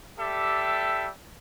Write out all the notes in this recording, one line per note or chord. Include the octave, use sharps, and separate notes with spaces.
G3 G4 A4 E5